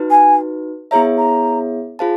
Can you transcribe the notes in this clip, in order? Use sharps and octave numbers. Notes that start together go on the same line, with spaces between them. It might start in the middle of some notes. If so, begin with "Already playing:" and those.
Already playing: D#4 F#4 B4
G#5
B3 E4 G#4 C#5 E5 A#5
A#5
F4 G#4 C5 F5 A5